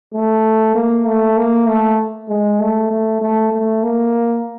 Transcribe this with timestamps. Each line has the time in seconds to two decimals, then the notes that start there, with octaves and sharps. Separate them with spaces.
0.13 A3
0.75 A#3
1.06 A3
1.37 A#3
1.67 A3
2.29 G#3
2.60 A3
2.90 A3
3.21 A3
3.52 A3
3.83 A#3